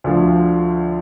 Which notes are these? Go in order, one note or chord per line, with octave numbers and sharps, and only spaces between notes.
D2 D3 F3